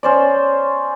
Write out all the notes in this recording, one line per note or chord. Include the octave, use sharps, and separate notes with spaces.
C#4 C5 D5